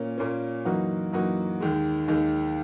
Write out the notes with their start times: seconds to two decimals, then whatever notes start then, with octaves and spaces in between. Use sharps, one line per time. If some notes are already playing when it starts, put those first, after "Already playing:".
Already playing: A#2 A#3 C#4
0.18 A#2 A#3 C#4
0.65 F#2 E3 A#3 D#4 F#4
1.13 F#2 E3 A#3 D#4 F#4
1.60 D#2 D#3 G#3
2.08 D#2 D#3 G#3